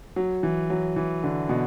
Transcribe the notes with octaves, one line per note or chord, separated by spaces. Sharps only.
F#3
E3
F#3
E3
D3
B2